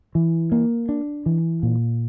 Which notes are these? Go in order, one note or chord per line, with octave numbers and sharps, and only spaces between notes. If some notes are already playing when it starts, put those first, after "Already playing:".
E3
A#3
D4
E3
A#2